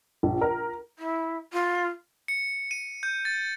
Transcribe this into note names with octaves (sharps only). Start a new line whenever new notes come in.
A#1
A#4
E4
F4
C#7
D#7
G6
A6